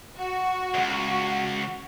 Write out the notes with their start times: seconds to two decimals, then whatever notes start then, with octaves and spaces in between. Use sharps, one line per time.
0.17 F#4
0.74 C#2 F#2